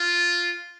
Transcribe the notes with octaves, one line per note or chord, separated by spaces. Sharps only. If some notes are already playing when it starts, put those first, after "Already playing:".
Already playing: F4